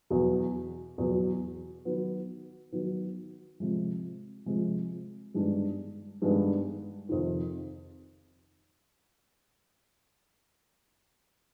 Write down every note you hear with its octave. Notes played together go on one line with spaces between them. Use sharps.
E2 B2 F#3
E2 B2 F#3
D#3 F#3 B3
D#3 F#3 B3
C3 F3 G#3
C3 F3 G#3
G2 D#3 G#3 B3 D4
G2 D#3 G#3 B3 D4
F2 C3 D#3